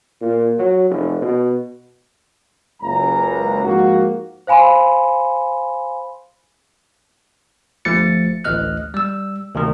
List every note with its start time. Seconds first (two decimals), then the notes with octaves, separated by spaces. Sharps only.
0.21 A#2
0.59 F#3
0.91 F1
1.22 B2
2.82 F#1 C#2 A#5
3.64 G#2 F3 A#3 F#4
4.47 C5 F5 G#5 B5 C6
7.85 G1 F3 A3 A6 C#7
8.44 A1 D2 D#5 F6 F#6
8.94 G3 E6
9.54 D2 C3 D#3